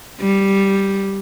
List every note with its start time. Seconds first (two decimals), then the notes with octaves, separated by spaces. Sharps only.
0.20 G3